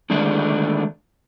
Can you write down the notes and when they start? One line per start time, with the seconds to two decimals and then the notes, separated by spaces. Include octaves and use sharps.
0.10 D3 D#3 G#3 A3 D4